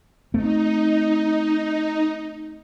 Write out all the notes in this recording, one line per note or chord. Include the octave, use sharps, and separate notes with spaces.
A3 C4 D#4